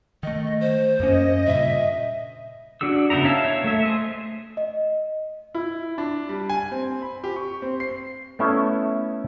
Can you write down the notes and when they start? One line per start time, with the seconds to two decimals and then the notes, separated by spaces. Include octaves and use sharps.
0.23 D#3 A3 D#5
0.61 C5
1.00 F#2 A#3 C#4 D#5
1.47 G2 A#2 C#3 E5
2.81 D4 F#4 G#4 E6
3.10 C#3 B3 D#4 E4 A#5
3.25 C#5 E5 F5 A5 E6
3.45 C#5
3.64 A3 E5
3.85 G#4 C5 D#5
4.57 D#5
5.55 E4
5.98 D4
6.29 G3
6.49 G#5
6.71 C4
7.02 B5
7.24 G4
7.36 C#6
7.62 C4
7.80 C7
8.39 A3 B3 C#4 E4 A4 E5